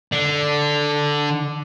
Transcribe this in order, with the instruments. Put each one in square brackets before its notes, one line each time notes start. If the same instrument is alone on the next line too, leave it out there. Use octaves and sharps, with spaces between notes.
[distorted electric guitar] D3 D4